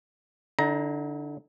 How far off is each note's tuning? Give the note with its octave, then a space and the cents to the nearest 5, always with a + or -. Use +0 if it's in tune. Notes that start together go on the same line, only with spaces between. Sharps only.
D3 +0 E4 -45 A#5 +15